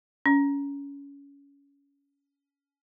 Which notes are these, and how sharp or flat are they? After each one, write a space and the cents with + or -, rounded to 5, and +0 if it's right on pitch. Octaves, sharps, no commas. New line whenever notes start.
C#4 +25